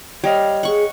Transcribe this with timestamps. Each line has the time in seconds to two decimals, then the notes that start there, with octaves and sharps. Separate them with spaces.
0.24 G3 C#5 D#5 F5
0.63 G#4 F#5 C#6